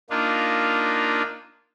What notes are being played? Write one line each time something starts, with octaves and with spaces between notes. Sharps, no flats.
A#3 D4 D#4 F4